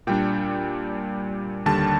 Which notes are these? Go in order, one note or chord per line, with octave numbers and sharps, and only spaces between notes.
A#2 G3 D4 G5
D#2 D3 G3 A5